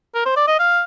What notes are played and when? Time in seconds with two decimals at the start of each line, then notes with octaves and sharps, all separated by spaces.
0.15 A#4
0.25 C5
0.36 D5
0.47 D#5
0.59 F5